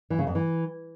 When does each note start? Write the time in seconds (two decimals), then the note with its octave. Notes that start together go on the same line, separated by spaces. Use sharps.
0.10 E3
0.19 C#3
0.27 F2
0.35 E3